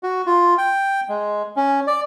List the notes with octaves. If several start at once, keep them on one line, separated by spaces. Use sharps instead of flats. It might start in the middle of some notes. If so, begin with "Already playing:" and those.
F#4
F4
G5
G#3
C#4
D5